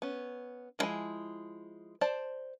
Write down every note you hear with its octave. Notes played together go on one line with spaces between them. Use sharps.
B3 C#4
D#3 F3 G#3 E4 G#5
C5 D5 A5